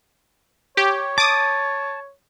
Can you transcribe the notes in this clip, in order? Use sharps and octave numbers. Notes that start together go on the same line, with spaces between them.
G4 C#5
A5 D6 D#6